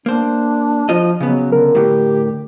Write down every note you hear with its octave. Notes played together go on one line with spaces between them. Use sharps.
A#3 D4 C5
F3 F4 D#5
C#3 F#3 B3
D3 A#4
A2 D3 G4